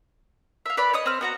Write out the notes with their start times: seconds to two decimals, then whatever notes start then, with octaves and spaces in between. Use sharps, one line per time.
0.66 E5 F5
0.77 B4 D5 B5
0.93 C#5 D#5 D#6
1.06 C4 F6
1.21 B3 F#4 A#5